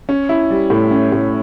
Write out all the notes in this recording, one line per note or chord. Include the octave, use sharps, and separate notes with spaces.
C#4
E4
G3
A2
C#4
A2